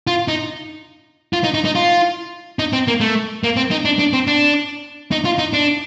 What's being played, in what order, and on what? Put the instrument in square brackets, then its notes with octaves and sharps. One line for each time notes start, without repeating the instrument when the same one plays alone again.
[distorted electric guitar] F4
D#4
F4
D#4
D#4
D#4
F4
D#4
C4
A#3
A3
A#3
C4
D#4
D4
D4
C4
D4
D#4
F4
D#4
D4